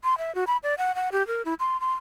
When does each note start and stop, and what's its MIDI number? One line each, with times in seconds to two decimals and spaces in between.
0.04 0.18 84
0.18 0.34 76
0.35 0.44 66
0.47 0.57 83
0.63 0.75 74
0.78 0.95 78
0.95 1.09 78
1.12 1.26 67
1.27 1.42 70
1.45 1.54 64
1.60 1.80 84
1.80 1.92 84